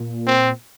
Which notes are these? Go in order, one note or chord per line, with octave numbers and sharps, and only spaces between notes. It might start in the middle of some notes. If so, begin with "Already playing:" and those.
Already playing: A#2
C4